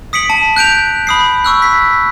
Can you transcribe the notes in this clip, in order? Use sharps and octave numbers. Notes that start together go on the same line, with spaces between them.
D#6 B6 C#7 D7 F#7
A5
F#6 G6 D7 F7
B5 D#6 C7
C#6 E6 F#6
B6